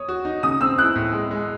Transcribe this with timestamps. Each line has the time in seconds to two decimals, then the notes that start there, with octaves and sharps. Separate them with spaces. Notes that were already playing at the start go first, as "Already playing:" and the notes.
Already playing: C#5 D#6
0.09 F#4
0.25 D#4
0.43 C#3 D#6
0.61 C4 E6
0.78 E4 F#6
0.95 A2
1.13 G#3
1.31 G#3